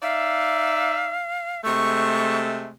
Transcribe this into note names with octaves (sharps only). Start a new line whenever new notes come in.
D#4 D5 E5 F5
C3 G#3 A3 C#6